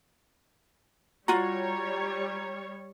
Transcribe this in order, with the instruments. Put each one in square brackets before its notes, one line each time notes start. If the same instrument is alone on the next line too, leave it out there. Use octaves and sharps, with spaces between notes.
[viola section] G3 C#5 [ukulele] F4 F#4 [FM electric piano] A#5